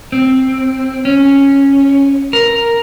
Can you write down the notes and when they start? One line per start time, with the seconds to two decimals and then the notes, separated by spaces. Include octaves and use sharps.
0.12 C4
1.05 C#4
2.33 A#4